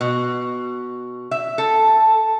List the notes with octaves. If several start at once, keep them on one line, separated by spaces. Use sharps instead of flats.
B2
E5
A4